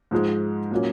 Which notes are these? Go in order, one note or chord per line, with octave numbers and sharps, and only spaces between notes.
G#2 F3 G#3
A#2 F#3 A#3 C#4